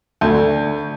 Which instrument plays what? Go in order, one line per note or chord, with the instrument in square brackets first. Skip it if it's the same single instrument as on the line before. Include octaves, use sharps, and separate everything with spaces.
[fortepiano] D2